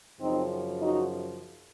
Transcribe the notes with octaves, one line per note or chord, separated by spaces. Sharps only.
F#2 C#3 F3 C4 D#4
D#4 F#4